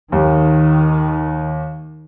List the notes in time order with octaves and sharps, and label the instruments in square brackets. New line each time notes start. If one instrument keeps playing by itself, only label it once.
[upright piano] D#2 [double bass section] D#3